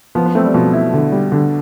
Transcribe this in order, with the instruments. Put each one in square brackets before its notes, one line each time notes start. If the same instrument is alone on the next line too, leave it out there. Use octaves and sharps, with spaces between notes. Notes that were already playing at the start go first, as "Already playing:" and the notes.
[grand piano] F3 [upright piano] B3
[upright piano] B3
[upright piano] A3 [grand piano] C4
[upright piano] G3
[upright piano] B2 [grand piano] F3
[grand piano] E4
D3
G3
D3